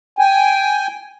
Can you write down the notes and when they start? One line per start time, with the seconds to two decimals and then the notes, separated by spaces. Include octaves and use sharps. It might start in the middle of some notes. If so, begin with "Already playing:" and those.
0.19 G5 G#5